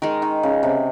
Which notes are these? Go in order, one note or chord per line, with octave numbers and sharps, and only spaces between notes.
D#3 G#3 D#4 A#4
D#3
C#3
C3